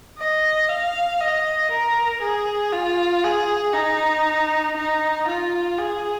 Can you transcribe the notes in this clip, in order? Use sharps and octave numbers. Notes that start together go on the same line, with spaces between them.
D#5
F5
D#5
A#4
G#4
F4
G#4
D#4
D#4
F4
G#4